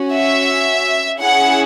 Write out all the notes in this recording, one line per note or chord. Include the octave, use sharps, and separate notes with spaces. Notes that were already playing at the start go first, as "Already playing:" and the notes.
Already playing: C#4 F#4
E5
C#4 E4 G#4 F#5